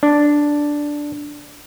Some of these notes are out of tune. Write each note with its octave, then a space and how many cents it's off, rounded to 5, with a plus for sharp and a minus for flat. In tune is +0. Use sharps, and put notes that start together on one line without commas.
D4 +0